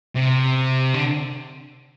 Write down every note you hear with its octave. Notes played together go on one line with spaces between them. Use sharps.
C3
D3